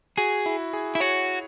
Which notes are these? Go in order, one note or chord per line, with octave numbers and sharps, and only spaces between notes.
F#4 G#4
E4
G#4
E4
F#4 C#5